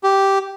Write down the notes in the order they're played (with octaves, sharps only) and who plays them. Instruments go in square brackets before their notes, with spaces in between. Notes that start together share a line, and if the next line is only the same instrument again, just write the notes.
[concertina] G4